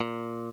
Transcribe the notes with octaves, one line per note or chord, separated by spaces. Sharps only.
A#2